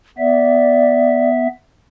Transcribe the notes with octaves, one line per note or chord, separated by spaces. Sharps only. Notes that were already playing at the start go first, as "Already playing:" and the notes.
B3 D5 E5